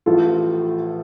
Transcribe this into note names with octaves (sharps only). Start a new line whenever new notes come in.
A1 A2 F3 F4 A4